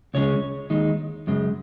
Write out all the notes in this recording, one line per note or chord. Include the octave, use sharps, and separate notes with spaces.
C#2 C#3 G#3 C#4 C#5
D#2 D#3 G#3 D#4
F#2 C#3 G#3